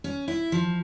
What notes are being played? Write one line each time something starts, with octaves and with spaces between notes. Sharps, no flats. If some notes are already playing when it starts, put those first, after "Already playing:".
C#4
E4
F3